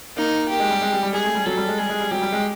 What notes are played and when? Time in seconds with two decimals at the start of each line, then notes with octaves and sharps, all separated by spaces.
0.17 A#3 D#4
0.49 A#3 G4
0.60 G#3
0.71 G3
0.82 G#3
0.92 G3
1.03 G3
1.14 G#3 G#4
1.25 A3
1.35 G3
1.46 F#3 A4
1.57 G3
1.68 G#3
1.78 G3 G#4
1.89 G#3
2.00 G3
2.11 F#3 G4
2.22 G3
2.32 G#3